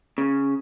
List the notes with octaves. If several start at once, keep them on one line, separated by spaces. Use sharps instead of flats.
C#3